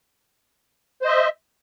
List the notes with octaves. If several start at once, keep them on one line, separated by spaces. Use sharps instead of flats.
C5 D#5 E5